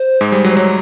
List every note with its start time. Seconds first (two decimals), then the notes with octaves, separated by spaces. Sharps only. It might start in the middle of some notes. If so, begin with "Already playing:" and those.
Already playing: C5
0.21 G#2 G#3
0.32 G3
0.44 F#3
0.50 C5
0.57 F#3 C#5